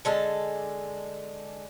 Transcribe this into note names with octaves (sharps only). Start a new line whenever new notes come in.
D3 G#3 A4